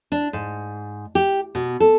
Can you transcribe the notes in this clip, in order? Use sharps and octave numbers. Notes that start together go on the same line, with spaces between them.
D4
G#2
G4
B2
A4